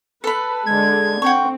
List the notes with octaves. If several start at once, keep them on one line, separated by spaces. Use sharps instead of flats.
A4 B4 B5
D3 G#3 G#6
C4 F#5 G5 C#6